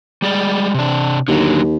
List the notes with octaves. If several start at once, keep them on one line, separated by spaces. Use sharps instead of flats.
G3 G#3 D5
C3 D4
D#2 D3 F#3